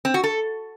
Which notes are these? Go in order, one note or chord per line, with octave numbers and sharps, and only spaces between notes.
C4
F#4
A4